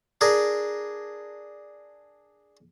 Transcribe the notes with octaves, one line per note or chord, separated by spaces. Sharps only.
D4 G#4 A#4